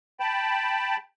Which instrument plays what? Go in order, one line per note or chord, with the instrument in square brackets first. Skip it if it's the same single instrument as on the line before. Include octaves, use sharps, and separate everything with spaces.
[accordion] G5 A5 B5